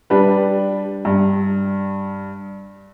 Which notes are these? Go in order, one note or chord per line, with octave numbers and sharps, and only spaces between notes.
G3 D4 B4
G2